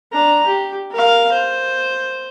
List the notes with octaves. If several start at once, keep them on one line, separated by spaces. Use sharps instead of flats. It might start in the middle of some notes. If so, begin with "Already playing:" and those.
D4 A#5
G4
A#4 F5
C5